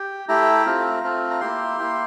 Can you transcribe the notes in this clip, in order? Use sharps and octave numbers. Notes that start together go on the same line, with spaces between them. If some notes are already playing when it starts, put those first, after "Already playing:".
Already playing: G4
A3 E4 G4 A#5
A3 C4 F4
A3 C4 F4
A#5
A#3 E4 G4 C6
A#3 E4 G4